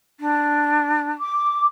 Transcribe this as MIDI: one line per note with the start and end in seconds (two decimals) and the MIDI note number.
0.20 1.11 62
1.19 1.66 86